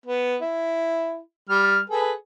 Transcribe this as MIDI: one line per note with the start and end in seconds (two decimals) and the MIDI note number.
0.06 0.36 59
0.42 1.18 64
1.49 1.80 55
1.49 1.80 89
1.90 2.12 68
1.90 2.12 69
1.90 2.12 71